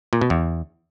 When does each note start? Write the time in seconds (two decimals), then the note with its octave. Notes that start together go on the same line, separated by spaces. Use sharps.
0.13 A#2
0.21 B2
0.30 E2